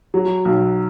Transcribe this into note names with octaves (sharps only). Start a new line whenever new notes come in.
F#3
B1